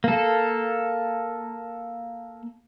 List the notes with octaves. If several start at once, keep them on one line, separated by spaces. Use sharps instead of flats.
A#3 A4